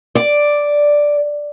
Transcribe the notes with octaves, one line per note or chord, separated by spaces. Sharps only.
D5